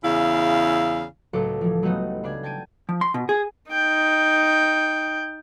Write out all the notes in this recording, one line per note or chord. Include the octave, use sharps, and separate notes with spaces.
E2 C#3 E4 F5
C#2 A2 F#3 A4 D6
E3 F3
F#3 G3 A3 B3 D#4 F#4
C#3 D4 D5 G#5
G5 A5 G#6 D7 D#7
F3
C6
B2
G#4
D#4 G5